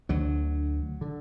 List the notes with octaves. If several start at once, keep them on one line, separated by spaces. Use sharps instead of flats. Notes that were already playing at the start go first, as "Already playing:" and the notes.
D2 D3 F#3
D3